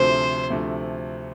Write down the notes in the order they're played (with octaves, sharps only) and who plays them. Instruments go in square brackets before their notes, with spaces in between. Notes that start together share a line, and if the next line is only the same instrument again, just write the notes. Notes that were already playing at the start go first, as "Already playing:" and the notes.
Already playing: [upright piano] D2 C3 F3 A3 C4 [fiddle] C5
[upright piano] D2 C3 F3 A3 C4